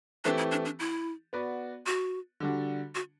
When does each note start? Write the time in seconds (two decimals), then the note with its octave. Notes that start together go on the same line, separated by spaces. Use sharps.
0.24 E3 A3 C4 D4 G4
0.38 E4
0.51 D4
0.65 D4
0.79 E4
1.33 B3 F#4 B4 D5
1.86 F#4
2.40 D3 G3 D4 F#4
2.95 F#4